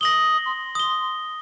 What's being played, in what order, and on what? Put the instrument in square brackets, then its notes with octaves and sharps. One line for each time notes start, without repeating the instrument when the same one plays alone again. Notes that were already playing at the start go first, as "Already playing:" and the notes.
[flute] D#6 [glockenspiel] A#6 F#7 G7
[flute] C6
[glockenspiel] D#6 G7